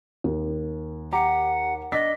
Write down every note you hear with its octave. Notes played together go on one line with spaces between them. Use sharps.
D#2
G4 F#5 A#5
D4 D#5 A6 B6